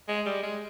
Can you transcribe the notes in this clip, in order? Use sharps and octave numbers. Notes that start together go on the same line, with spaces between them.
G#3
G3
G#3